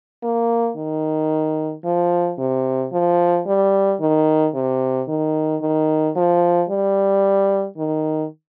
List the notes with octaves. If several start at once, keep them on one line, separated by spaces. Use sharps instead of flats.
A#3
D#3
F3
C3
F3
G3
D#3
C3
D#3
D#3
F3
G3
D#3